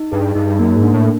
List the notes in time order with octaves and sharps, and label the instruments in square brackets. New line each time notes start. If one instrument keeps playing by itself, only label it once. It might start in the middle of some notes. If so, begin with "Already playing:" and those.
Already playing: [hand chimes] D#4
[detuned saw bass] G2 [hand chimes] G#4
[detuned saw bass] G2 [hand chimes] D#4
[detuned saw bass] F#2 [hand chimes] A#3
[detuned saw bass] G#2
[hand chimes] D4
[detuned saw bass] A2